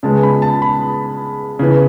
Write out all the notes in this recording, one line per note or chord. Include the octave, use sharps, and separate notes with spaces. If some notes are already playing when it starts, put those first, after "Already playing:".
C#3 G#3 B3 A5
B5
A5
B5
C#3 E3 B3